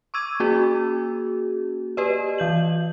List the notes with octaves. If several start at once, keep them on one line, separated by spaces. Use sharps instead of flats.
C#6 D6 E6 G#6 D#7
A#3 C#4 F#4 G#4
G4 B4 D5 D#5
E3 G6 F#7